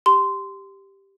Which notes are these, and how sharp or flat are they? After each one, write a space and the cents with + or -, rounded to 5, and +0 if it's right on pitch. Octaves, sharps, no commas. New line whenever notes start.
G4 +0 C6 -15